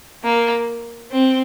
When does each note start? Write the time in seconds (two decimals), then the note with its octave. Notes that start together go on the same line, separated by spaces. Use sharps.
0.24 A#3
1.12 C4